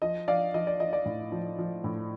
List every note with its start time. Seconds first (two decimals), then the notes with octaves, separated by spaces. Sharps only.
0.02 F3 D#5
0.28 F3 D5 F5
0.54 F3 D#5
0.67 D5
0.80 F3 D#5
0.93 D5
1.05 A2
1.32 F3
1.59 F3
1.84 A2